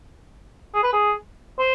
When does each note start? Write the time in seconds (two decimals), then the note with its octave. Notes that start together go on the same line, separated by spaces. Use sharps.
0.75 G#4
0.83 B4
0.93 G#4
1.59 C5